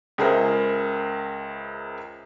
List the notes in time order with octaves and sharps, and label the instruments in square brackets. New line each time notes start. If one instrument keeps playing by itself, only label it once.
[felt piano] C#2 G#4 A#4 C5 E5